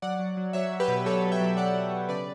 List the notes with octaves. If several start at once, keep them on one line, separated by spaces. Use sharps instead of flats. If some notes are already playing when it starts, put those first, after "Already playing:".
F#3 D5 F#5
F#3
F#3
F#3 C#5 E5
F#3
G4 B4
B2
F#3 A4 C#5
F#3
E5 G5
F#3
F#3 D5 F#5
F#3
F#3
C#3 B4 D5